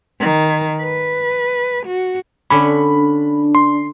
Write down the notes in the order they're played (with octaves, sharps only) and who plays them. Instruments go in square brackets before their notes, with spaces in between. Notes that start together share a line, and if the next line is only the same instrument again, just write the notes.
[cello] D#3
B4
F#4
[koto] D3 C#4 [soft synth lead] D4 [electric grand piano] B5
[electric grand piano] C6